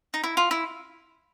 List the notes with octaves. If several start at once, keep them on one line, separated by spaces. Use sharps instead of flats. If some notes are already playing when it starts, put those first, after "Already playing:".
D#4
E4
F4
E4